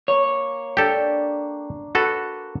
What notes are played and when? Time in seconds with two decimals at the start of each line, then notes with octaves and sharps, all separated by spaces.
0.08 A#3 C#5
0.77 D4 G4 A4
1.95 F#4 A4 B4